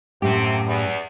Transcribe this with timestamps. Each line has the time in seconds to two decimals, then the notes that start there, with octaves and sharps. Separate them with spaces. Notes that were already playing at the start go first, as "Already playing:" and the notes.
0.22 F#2 A2 C3 A#3 C4 G4
0.66 E2